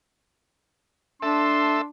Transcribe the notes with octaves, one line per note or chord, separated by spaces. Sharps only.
D4 A4 E5 C6